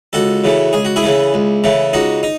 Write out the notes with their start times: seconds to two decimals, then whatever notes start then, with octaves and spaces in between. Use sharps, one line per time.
0.13 C#2 F#4 A4
0.44 C#3 E3 A3
0.73 C#2 G#4
0.85 F#4
0.96 E4 G#4
1.03 C#3 E3 A3
1.34 C#2
1.64 C#3 E3 A3
1.93 C#2 D#4 F#4
2.23 D#4